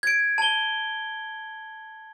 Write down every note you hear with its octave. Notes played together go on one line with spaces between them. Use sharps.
G#6 D7
A5 G7